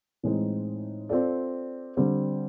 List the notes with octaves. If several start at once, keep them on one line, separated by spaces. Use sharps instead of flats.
A2 E3 G#3 C4 D#4
C4 F4 A4 D5
D3 G3 C4